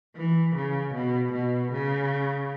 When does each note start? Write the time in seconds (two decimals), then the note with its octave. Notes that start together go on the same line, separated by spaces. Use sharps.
0.16 E3
0.55 C#3
0.94 B2
1.33 B2
1.72 C#3